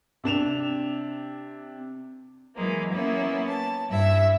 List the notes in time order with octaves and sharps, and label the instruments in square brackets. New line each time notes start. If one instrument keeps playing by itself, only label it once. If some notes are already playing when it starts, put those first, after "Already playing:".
[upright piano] C3 D4 E7 F7
[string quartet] E3 F#3 G#3 A#3
A#3 B3 C#4 E4
A5
G2 E4 E5